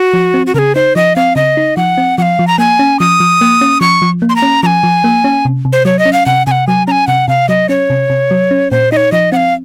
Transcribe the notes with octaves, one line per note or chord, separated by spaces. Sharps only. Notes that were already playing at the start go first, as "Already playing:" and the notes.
Already playing: F#4
F3
C4
F#4
C#3 G#4 A#4
D#4 C5
F3 D#5
C4 F5
C#3 D#5
D#4
F3 F#5
C4
F3 F5 F#5
F3
A#5
A#3 G#5
C#4
F3 D#6
F3
A#3
C#4
F3 C#6
F3
A#3
C6
A#5
C#4
F3 G#5 A#5
F3
A#3
C#4
C3
C3
C5
F#3 C#5
D#5
C#4
F5
C3 F#5
C3 F#5 G#5
F#3 G#5
C#4 G#5 A#5
C3 F#5
C3 F5
F#3 D#5
C#4 C#5
C3
C3
F#3
C#4
A#2 C5
D#4 C#5 D#5
F3 D#5
C4 F5 F#5